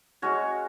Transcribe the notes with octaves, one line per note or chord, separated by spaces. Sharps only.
G#3 C#4 F#4 C#5